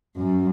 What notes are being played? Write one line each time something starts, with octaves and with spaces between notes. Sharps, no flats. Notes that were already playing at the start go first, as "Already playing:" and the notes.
F#2